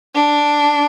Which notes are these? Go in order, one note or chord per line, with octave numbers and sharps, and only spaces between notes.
D4